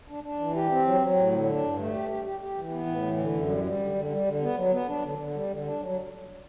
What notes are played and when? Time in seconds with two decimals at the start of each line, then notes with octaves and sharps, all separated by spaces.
0.09 D4
0.24 D4
0.39 E3
0.55 G4
0.70 C4
0.85 F#3
1.01 F#3
1.16 A2
1.32 D3
1.48 D4
1.63 G2
1.78 A3
1.93 G4
2.09 G4
2.25 G4
2.40 G4
2.56 E3
2.71 B3
2.86 A2
3.02 E3
3.17 D3
3.32 F#2
3.48 G3
3.64 G3
3.80 D3
3.95 D3
4.11 G3
4.26 D3
4.41 B3
4.56 F#3
4.71 B3
4.88 D4
5.03 D3
5.18 D3
5.34 G3
5.50 D3
5.65 D4
5.80 F#3